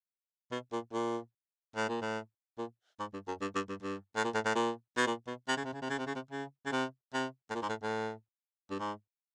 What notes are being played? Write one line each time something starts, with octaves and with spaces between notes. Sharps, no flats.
B2
A#2
A#2
A2
A#2
A2
A#2
G#2
G2
F#2
G2
G2
G2
G2
A2
A#2
A2
A2
A#2
B2
A#2
B2
C3
C#3
C3
C#3
C3
C#3
C3
C#3
C3
C#3
C#3
C3
C3
A2
A#2
G#2
A2
A2
G2
G#2